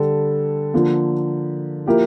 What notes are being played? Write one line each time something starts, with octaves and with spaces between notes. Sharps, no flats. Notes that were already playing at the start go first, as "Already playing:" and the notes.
Already playing: D3 G3 D4 A4
D3 F3 A#3
F3 A#3 E4 G4 A#4